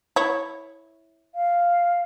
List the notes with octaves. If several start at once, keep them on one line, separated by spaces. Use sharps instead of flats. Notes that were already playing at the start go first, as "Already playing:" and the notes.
E4 C#5
F5